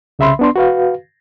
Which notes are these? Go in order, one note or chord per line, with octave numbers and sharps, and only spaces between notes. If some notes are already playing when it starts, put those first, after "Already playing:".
C2 C#3 E5 B5 C6
B3 D4 C6
F#4 B4 F5